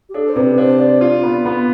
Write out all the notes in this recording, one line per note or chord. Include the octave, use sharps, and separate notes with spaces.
G4
D4 A4
C5
C3 B4
D4 C5
D4 D5
F4
B3
B3